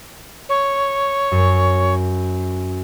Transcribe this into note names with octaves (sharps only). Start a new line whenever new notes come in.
C#5
F#2